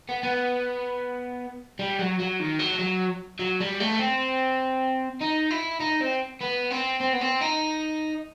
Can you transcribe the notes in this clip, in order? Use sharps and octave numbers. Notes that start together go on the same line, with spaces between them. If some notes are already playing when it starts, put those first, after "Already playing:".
B3
B3
G3
F#3
F#3
D#3
F#3
F#3
F#3
G3
A3
C4
D#4
E4
D#4
C4
B3
C4
C4
B3
C4
D#4